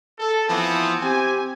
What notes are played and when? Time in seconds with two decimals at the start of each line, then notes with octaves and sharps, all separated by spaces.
0.19 A4
0.49 E3 F3 B3 C4
1.02 C4 G4 G#5